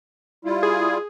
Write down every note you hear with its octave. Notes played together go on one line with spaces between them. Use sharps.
G3 E4 F4
G#4